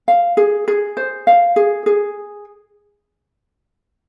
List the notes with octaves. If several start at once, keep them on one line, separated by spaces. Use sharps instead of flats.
F5
G#4
G#4
C5
F5
G#4
G#4